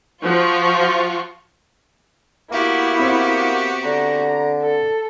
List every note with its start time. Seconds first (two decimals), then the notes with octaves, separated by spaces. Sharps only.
0.23 F3 F4 F#4 C#6
2.51 A#3 B3 E4 F#4 G4
3.00 C4 C5 E5
3.85 D3 A#5
4.62 A4